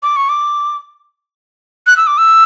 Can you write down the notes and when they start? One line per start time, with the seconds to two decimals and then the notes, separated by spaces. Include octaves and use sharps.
0.03 D6
0.16 C#6
0.29 D6
1.87 F#6
1.97 E6
2.07 D6
2.18 E6